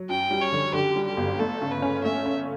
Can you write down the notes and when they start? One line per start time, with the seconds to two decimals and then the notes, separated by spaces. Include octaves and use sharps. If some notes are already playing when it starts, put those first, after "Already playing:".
Already playing: F#3
0.09 F#2 G5
0.31 G3
0.42 C#5
0.53 D3
0.73 D3 G4
0.96 G3
1.07 G4
1.17 G1
1.39 A3 A4
1.61 C#3
1.71 B4
1.82 C#4
2.04 A3 E5
2.26 C#4